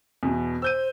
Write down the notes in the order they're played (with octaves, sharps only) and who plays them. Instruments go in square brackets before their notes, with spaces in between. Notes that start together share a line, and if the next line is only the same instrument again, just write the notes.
[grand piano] E2 B2
[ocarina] C5 [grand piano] E6 G6 D#7